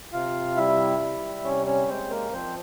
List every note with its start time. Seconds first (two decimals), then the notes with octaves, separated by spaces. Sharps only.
0.12 C3 F4 F5
0.57 G3 E4 E5
1.00 G3
1.44 C3 C#4 C#5
1.66 C#4 C#5
1.88 G#3 C4 C5
2.10 A#3 A#4
2.32 F3 C4 C5